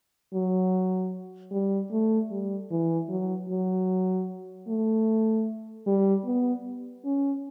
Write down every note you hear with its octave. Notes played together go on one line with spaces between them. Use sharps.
F#3
G3
A3
G3
E3
F#3
F#3
A3
G3
B3
C#4